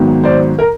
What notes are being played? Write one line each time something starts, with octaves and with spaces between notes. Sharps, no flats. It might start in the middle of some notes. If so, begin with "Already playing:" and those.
Already playing: G#1 G#2 D#3 F#3 B3
C5 D5
A#4